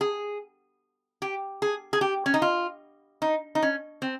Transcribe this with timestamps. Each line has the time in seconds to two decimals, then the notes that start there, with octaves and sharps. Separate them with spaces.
0.01 G#4
1.22 G4
1.62 G#4
1.93 G#4
2.01 G4
2.26 C#4
2.34 D#4
2.42 F4
3.22 D#4
3.55 D#4
3.62 C#4
4.02 C4